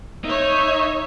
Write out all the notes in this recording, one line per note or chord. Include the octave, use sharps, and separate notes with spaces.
D#4 C#5 E5